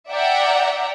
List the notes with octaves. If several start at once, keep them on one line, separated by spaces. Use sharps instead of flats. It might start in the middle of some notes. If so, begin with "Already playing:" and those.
D5 E5 F#5 G5 A#5